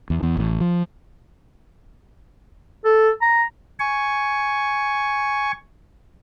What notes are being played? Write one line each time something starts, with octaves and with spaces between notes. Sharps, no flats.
E2
E2
A1
F3
A4
A#5
G#5 C#6